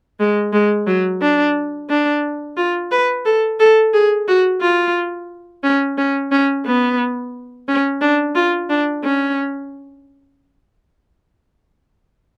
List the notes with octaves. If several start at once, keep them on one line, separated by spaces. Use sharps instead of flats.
G#3
G#3
F#3
D4
D4
F4
B4
A4
A4
G#4
F#4
F4
C#4
C#4
C#4
B3
C#4
D4
F4
D4
C#4